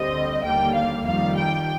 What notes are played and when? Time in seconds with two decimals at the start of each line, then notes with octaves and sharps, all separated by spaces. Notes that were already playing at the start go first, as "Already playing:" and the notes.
Already playing: D2 D3 G3 C4 D#5
0.44 D#2 D3 G3 A#3 G5
0.75 F5
1.06 F2 D#3 G3 F5
1.37 G5